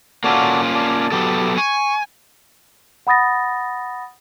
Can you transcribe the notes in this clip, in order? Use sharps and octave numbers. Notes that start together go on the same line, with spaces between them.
A#3 C#4 F4 F#4 A4 D5
D5 A5
F#3 B3 G4 A4
G#5 C#6
F#5 B5 D#6 A6 A#6